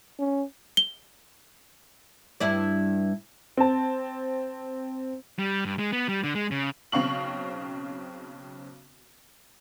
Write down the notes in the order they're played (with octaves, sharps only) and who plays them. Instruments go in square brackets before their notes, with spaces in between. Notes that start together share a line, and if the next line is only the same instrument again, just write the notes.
[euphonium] C#4
[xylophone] G7
[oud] G2 E4 D5
[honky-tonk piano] C4 A5
[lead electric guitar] G3
G2
G#3
B3
G3
D3
G#3
C#3
[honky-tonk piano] B1 C#3 C4 F5 C#6 F#7